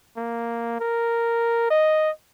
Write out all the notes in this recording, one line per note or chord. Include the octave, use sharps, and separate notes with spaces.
A#3
A#4
D#5